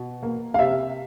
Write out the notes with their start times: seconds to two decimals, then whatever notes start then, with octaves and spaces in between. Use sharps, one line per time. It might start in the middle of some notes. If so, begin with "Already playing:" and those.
Already playing: B2
0.23 A#3
0.54 F5
0.59 C3 E5